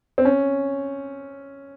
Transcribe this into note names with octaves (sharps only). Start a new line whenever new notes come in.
C4
C#4